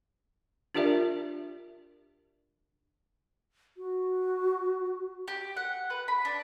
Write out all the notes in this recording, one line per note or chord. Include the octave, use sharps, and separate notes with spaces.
D4 F4 G4 A#4 D5 E5
F#4
G4
F#5
B4
B5
D4